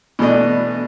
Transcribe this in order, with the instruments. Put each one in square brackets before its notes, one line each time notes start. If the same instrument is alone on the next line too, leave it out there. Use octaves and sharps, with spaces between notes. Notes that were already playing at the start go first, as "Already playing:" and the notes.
[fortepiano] B2 E3 A3 D4 D#5